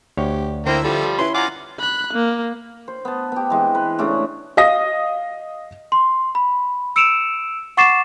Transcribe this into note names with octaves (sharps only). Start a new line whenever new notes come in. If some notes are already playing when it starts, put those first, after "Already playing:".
D2 G4 C#5
D3 A#3 E4 C5 G5 E6
F3 G3 A4
C#4 E4 B4 C6
F4 F#5 G#5 A#5 D6
B5 F#6
A#3
C5
B3 A5
B3 G4
E3 G#3 C4
B4
C#3 G#3 A3 D4
D#5 F5 D#6 A#6
C6
B5
E6 C#7 D7 E7 F7
F#5 C#6 D6 A6 C7 E7